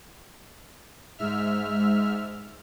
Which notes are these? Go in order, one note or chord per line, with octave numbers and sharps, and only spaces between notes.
G#2 E5 F6